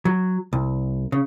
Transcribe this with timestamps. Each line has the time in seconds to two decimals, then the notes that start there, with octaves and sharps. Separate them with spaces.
0.05 F#3
0.53 C2
1.12 C#3